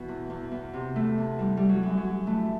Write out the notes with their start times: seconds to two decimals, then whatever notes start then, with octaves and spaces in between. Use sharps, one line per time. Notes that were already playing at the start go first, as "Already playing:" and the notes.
Already playing: B2 E3 F#4
0.08 E2
0.30 E2
0.51 E2
0.73 C3
0.96 E3 A3
1.18 E2
1.39 E3 G3
1.57 E3 G3
1.69 F#3
1.83 F#2
1.97 F#3
2.04 F#2
2.26 E3 A3